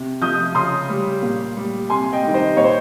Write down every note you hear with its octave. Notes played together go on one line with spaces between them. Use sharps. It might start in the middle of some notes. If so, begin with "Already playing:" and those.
Already playing: C3
F3 D#6 G6
C#3 C6 D#6
G3
A#2
G3
C3 G#5 C6
D#5 G5
D#3 G3
C5 D#5
A#2 C#5
C5